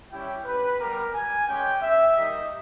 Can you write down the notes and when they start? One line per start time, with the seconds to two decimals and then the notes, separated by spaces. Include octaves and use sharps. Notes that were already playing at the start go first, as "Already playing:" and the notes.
0.11 G3 C#4 E4 G4 G5
0.45 B4
0.80 G3 B3 G4 A#4
1.14 G#5
1.47 G#3 C#4 G4 G5
1.82 E5
2.16 G3 A#3 D#4 G4 D#5